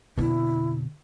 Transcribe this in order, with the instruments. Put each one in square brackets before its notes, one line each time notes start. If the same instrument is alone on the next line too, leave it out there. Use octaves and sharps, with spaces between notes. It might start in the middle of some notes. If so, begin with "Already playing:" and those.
[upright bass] F2 D3 [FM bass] B2 [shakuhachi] E4